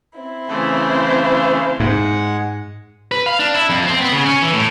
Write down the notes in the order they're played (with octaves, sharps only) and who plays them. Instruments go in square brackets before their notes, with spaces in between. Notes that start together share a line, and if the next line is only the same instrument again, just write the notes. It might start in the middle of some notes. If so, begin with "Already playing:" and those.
[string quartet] C4 E4
[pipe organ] C#3 E3 A3 [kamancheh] C5 F5
[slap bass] G#2 [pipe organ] G#3 F#5
[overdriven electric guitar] B4
F5
D4
E4
F2
C4
B3
C#3
C#4
E3
A2